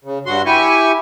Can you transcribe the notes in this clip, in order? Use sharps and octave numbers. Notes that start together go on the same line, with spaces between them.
C#3
G2 F#4 C6
E4 G4 G#5 C#6